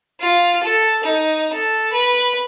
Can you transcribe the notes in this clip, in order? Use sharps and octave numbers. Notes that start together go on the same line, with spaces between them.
F4
A4
D#4
A4
B4